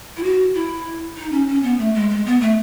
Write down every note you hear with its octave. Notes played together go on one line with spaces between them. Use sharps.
E4
F#4
E4
D#4
C#4
C#4
B3
A3
G#3
G#3
B3
A3